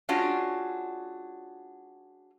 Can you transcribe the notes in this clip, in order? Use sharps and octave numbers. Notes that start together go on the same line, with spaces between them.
G#3 C#4 D4 F4 F#4